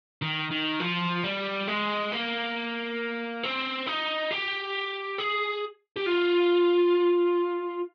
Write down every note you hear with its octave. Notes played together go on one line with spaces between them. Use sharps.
D#3
D#3
F3
G3
G#3
A#3
C4
D#4
G4
G#4
G4
F4